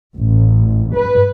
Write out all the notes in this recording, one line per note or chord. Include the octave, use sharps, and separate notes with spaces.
A1
B4